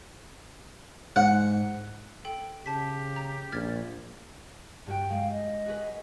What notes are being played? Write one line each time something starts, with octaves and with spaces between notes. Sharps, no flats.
G#2 F#5
A4 G5 D7
C#3 G4 A5 B6
A#5
A#1 F6 G#6 A6
G2 F#4 G5
G#3 F5
D#5
F#4 G#4 B4